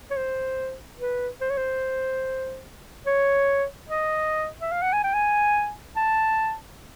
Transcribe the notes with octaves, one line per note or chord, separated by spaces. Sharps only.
C#5
C5
B4
C5
C#5
C5
C#5
D#5
E5
F5
F#5
G#5
G5
G#5
A5